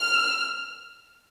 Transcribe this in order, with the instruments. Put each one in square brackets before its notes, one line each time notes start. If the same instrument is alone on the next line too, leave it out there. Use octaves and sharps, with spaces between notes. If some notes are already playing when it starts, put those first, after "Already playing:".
Already playing: [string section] F6